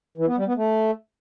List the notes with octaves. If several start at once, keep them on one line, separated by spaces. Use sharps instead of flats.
E3
B3
G3
B3
A3